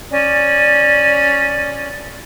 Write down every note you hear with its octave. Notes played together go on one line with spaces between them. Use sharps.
C#4 D5